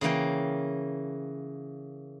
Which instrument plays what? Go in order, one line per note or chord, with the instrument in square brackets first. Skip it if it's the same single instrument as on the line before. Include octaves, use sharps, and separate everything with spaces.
[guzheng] C#3 E3 A#3 G5